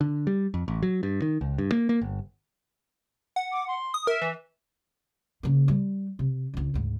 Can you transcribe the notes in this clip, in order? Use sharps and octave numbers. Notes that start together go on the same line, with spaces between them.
D3
G3
F2
A1
F#3
G2
D#3
C#2
G2
A#3
A#3
G1
F#5
D6
C6
D#6
A#4 E5
E3
C#3 A#3
G3
C3
C#2 D4
D2 G#2